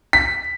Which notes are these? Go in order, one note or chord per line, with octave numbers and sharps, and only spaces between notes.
B6